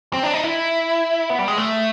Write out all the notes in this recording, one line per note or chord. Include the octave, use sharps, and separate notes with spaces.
C4
D4
D#4
E4
B3
G3
G#3
A3